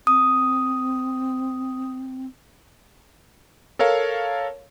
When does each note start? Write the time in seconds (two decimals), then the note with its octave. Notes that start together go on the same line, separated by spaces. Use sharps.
0.07 C4 D#6
3.79 A4 A#4 C#5 F5 A5